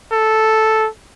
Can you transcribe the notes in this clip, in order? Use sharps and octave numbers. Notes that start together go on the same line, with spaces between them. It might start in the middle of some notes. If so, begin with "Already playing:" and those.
A4